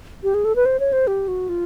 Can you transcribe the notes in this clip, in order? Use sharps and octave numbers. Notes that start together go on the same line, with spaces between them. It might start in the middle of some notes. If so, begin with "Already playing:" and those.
G4
G#4
A4
B4
C5
C#5
C5
G4
F#4
F4